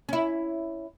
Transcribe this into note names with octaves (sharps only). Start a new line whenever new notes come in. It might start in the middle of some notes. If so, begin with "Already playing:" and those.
C#4 E4